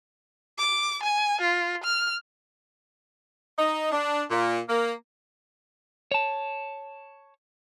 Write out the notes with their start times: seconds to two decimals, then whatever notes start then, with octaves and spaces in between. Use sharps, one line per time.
0.58 D6
1.03 G#5
1.41 F4
1.84 F6
3.59 D#4
3.92 D4
4.30 A#2
4.69 A#3
6.12 C#5 A5